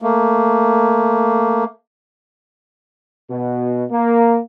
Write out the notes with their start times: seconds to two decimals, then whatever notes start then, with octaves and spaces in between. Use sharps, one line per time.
0.02 A3 A#3
3.30 B2
3.91 A#3